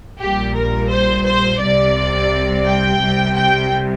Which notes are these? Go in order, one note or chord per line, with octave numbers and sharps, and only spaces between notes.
A#1 A#2 G3 G4
A#4
C5
C5
C2 C3 G3 D5
G5
C2 C3 G3
G5